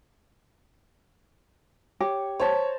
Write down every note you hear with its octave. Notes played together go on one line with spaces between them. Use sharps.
G4 C#5
C5 C#5 A5 A#5